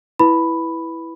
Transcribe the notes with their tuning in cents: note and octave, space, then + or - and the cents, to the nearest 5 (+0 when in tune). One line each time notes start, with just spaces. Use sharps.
E4 +0 B4 -5 B5 +0